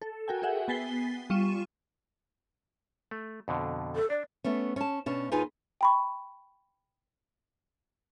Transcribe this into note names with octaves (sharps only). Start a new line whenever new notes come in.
A4
F#4 A#4 G5 G#5
F#4 G#4 E5 F#5 G5
B3 G#5 A6 B6 C7 G7
G3 F4 C#6 D#7 E7
A3
F2 B2 D3
A4
D4 D5
A3 B3 C#4
C#4 A5
B2 C#4 D4
D#2 D#4 F4 G#4 B4 G#5
G5 B5 C#6